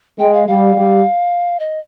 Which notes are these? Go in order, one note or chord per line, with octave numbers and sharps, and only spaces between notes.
G#3 G5
F5
G3 F5
G3
D#5